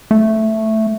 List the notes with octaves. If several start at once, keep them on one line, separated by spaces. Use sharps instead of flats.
A3